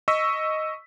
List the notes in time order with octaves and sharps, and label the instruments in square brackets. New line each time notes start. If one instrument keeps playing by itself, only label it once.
[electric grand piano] D#5 C#6 E6 B6